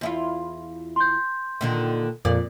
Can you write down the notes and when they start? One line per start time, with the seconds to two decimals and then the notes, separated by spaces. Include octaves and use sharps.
0.01 E2 E4 F4
0.96 C6 G6
1.61 A#2 D3 D#3
2.25 F2 A#2 D5